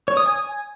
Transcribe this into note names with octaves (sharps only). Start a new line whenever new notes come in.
C#5
D#6
G#5